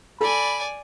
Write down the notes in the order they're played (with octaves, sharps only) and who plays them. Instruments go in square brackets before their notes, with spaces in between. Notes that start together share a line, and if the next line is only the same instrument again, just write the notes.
[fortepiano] A4 [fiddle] D5 G#5 [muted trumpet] B5